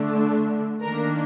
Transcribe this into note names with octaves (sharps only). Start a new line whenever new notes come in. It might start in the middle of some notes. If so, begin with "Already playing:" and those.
Already playing: D3 A3 D4
D#3 A#3 D4 A#4